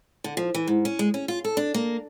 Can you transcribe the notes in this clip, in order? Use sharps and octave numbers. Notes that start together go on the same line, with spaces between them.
D3
F3
E3
G#2
C#4
G#3
C#4
F4
A4
D4
A#3